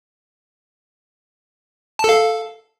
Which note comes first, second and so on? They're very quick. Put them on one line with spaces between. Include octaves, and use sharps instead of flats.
A5 A4 F5